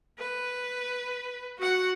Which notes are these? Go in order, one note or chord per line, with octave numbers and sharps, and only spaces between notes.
B4
F#4 F#5